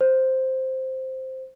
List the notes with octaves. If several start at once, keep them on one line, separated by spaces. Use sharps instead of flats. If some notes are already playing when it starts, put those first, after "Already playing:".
C5